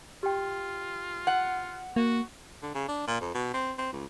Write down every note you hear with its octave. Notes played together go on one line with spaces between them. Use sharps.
F4 G4 G5
F#5
A#3 F#4
D3
C#3
D4
A#2
F2
B2
C4
C4
C#2